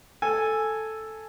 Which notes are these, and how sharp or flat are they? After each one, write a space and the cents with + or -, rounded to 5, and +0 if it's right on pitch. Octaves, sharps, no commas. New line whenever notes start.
A4 +0 G#5 +0